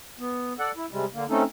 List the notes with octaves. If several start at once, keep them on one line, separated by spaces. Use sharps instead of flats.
B3
A4 D5 F#5
E4
C3 G3 G#3
D3 A#3
A3 C4 C#4 D#4 A4